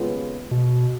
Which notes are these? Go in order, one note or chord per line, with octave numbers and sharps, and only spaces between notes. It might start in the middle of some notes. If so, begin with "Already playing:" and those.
Already playing: D#2 C#3 G#3 B3 F4
B2